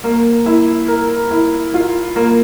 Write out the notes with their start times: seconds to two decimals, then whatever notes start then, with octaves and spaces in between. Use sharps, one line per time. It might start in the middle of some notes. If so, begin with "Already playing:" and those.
0.04 A#3
0.46 E4
0.88 A#4
1.31 E4
1.74 F4
2.16 A#3